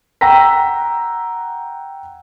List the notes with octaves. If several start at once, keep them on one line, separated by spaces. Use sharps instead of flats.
F#5 G5 A#5 E6 A#6 B6